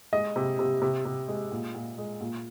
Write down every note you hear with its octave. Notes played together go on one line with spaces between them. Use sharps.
G#3 D#5
C3
C3
C3
C3
G#3
A#2
A#2
G#3
A#2